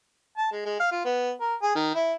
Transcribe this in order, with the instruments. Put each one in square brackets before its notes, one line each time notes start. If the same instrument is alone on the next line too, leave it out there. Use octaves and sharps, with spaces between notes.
[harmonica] A5
G#3
G#3
F5
F4
B3
A#4
G#4
D#3
E4